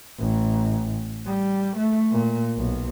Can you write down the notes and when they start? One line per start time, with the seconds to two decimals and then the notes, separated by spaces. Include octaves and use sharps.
0.19 A1
1.26 G3
1.77 A3
2.11 A#2
2.57 B1